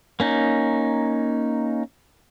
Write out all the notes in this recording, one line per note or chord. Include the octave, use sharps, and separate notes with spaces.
A#3 C#4 D#4